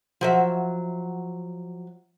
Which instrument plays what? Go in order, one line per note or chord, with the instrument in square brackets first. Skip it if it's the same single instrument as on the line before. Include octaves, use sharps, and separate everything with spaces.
[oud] F3 F#3 E5